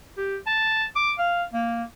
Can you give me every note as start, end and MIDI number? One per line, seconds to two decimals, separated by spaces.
0.17 0.36 67
0.47 0.85 81
0.96 1.12 86
1.19 1.43 77
1.53 1.83 58